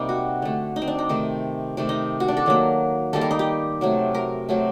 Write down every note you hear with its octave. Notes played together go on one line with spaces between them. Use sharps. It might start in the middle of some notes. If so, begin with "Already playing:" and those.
Already playing: C3 G3 A#3 C4 D#4
F#4
D3 A3
D#4
C4
D4
D#4
C3 D#3 A3
C3 D#3 A3
D#4
F#4
D4
A4
D#3 F#3 A#3
D#3 G3 A#3 A4
A#4
D#4
G4
C3 F#3 A3
A#4
C3 F#3 A3